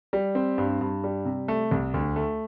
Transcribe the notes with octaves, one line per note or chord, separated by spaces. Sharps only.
G3
C4
G2
G2
G3
C3
A3
C2
D2
A3